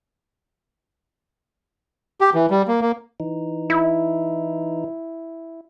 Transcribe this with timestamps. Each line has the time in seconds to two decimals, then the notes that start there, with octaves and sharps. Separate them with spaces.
2.21 G4
2.34 E3
2.50 G3
2.68 A#3
2.81 A#3
3.20 E3 D#4
3.70 E4